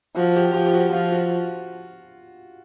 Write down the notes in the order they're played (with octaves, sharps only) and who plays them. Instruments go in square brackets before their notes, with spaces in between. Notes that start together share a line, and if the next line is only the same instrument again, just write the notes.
[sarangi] F3 [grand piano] F#4
[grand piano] G4
[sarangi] F3 [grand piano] G4
[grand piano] G4
F#4
[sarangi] F3 [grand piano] F4
[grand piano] F#4